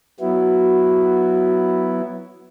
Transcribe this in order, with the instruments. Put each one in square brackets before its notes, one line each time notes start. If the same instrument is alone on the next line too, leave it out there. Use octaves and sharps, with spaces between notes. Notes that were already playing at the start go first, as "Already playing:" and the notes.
[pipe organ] F#3 B3 E4 [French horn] F#4